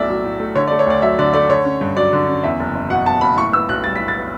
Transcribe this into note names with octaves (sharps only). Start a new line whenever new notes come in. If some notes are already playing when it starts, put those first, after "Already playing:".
Already playing: B1 A2 A3 D5 E5
F#3
A2
A3
D3 C#5
D5
A3
C#5
D2 D5
F#3 E5
D3 D5
A3 D5
D3 C#5
C#4
G2
F#3 D5
D3
C#4
E2 E5
F#1
F#1
B2 F#5
E2 A5
F#1 B5
A2 C#6
B3 E6
B1 F#6
G3 A6
B6
A2
A6
B3